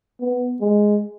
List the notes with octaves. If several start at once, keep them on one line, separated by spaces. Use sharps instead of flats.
B3
G#3